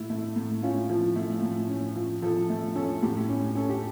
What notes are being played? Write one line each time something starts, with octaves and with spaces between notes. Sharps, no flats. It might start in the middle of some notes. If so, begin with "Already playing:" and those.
Already playing: A2 E4
A3
A2
C#4 F4
F3
A3
A2
C#4
F3
F3 A4
A3
C#4 A4
A2 G4
C#4
C#4 A4
G4